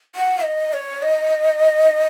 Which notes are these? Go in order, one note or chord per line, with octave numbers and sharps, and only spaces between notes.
F#5
D#5
C#5
D#5